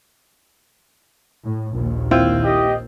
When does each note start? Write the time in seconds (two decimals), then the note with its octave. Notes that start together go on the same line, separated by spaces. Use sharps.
1.43 A2
1.74 A#1 D#2
2.11 C4 E4 F4
2.44 G4 D#5